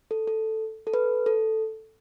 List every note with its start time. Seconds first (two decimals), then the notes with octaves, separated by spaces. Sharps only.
0.11 A4
0.28 A4
0.87 A4
0.94 B4
1.26 A4